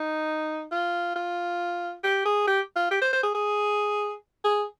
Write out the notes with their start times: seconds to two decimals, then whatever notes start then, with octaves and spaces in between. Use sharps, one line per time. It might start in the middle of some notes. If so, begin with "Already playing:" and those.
Already playing: D#4
0.72 F4
1.16 F4
2.04 G4
2.25 G#4
2.47 G4
2.76 F4
2.91 G4
3.02 C5
3.13 C5
3.23 G#4
3.35 G#4
4.44 G#4